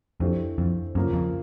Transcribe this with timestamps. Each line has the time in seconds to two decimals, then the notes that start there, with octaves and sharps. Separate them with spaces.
0.20 F2 E3 A3 D4 G4 C5
0.58 F2
0.95 F#2 C#3 F3 A#3 C#4
1.13 F2